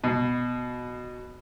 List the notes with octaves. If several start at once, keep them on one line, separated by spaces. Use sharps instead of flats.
B2